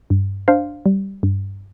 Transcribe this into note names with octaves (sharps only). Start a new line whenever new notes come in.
G2
D4 C5 F5
G3
G2